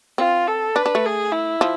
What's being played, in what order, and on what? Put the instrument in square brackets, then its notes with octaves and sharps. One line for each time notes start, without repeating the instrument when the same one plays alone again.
[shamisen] C4 [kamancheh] F4
[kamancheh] A4
[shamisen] D4 [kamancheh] B4
[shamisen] D4
A3
[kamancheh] G#4
E4
[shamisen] F3